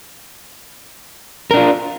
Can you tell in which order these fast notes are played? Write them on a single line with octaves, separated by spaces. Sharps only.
A#4 D4 F4